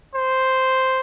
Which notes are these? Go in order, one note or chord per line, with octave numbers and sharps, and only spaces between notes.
C5